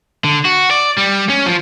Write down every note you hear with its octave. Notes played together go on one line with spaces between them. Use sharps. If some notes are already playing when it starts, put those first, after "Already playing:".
D3
F#4
D5
G3
C#4
F3